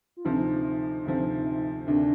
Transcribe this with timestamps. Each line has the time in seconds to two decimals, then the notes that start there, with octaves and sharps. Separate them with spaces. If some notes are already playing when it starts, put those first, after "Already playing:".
0.17 F4
0.25 D2 C3 F3 C4 D#4
1.05 D2 C3 F3 C4
1.86 D2 C3 D#3 D4